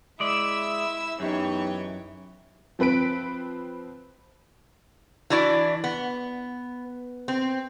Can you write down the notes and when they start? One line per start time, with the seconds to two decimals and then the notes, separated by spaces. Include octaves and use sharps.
0.20 G#3 E4 D5 E5 E6
1.20 F#2 E3 B3 D#4 G4 C#5 G5
2.79 F3 C4 B4 B6 D7
5.30 E3 D4 E4 F#4 D5
5.84 B3
7.28 C4